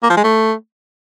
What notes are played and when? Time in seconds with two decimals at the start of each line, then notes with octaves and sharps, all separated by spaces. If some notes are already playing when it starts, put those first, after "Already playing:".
0.03 A#3
0.10 F3
0.17 G#3
0.24 A3